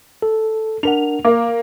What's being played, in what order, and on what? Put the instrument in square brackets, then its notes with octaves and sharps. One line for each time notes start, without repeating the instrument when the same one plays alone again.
[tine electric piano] A4
[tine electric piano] D4 A#4 F#5 [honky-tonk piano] F7
[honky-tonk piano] A#3 [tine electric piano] D6